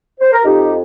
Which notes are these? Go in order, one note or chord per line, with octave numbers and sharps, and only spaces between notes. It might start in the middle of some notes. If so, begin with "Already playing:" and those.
C5
A#4
F2 D#4 G4